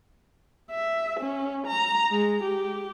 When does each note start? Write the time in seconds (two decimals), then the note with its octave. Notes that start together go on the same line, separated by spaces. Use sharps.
0.71 E5
1.20 C#4
1.67 A#5
2.11 G#3
2.43 G4